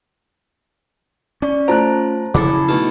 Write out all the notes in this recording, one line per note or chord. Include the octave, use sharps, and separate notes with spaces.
C#4 D5
A3 F4 C5 A5 A#5 F#6
C#3 F3 F#3 E4 G#4 A4 D6
B2 A3 D#4 A5